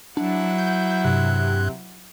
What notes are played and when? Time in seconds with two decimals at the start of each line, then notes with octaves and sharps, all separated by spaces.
0.17 F#3 D4 E4 F#5
0.58 G6
1.05 G2 C3 F#6